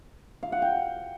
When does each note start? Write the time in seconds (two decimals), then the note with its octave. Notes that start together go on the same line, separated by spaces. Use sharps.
0.43 F5
0.52 F#5
0.62 G5